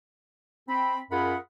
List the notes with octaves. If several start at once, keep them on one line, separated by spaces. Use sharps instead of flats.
C4 B5
F#2 F4 G#4 A#4 F#5 B5